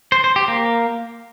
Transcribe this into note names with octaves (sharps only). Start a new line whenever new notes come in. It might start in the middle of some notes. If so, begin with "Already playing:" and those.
C5
C5
G4
A#3